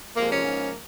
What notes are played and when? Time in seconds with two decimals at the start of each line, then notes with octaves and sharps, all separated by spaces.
0.17 F2 C3 F3 G#3 A#3
0.31 A#3 C#4
0.45 G#2 F3 G#3